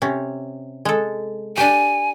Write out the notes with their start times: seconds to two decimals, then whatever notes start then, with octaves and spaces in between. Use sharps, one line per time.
0.02 C3 C#4
0.85 G#3 A4
1.57 D4 G4 G#5